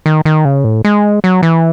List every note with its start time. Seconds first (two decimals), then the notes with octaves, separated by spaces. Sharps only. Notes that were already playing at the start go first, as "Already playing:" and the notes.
0.06 D#3
0.25 D#3
0.45 C#3
0.64 A2
0.85 G#3
1.24 F#3
1.43 E3